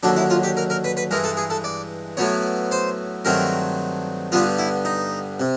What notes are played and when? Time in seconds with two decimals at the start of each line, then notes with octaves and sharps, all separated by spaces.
0.03 D#2 D3 F#3 D4
0.17 E4
0.30 F4
0.43 G4
0.57 A#4
0.70 A#4
0.84 B4
0.97 B4
1.11 G2 E3 G#3 A#4
1.24 A4
1.37 G#4
1.50 A4
1.64 D5
2.17 A2 F#3 B3 C#5
2.71 C5
3.25 G2 D#3 F#3 A3 C4 A#4
4.32 G2 D3 G3 B3 F4
4.59 E4
4.85 D#4
5.40 C3